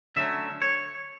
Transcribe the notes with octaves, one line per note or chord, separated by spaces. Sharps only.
D3 F#3 A3 C#4 E5
C#5